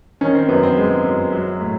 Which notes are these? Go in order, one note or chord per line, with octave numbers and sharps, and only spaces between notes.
D#3 C#4
C4
F#2 B3
C4
G#3
F#2
F#3
A2